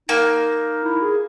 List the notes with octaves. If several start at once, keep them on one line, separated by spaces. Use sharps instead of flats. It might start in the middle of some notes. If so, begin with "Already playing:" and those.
A#3 D#4
E4
G#4